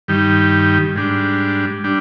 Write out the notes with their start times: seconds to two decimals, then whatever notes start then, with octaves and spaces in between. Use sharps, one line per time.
0.08 G2 D#3 G3
0.96 G#2 G3 D4
1.84 G3 D4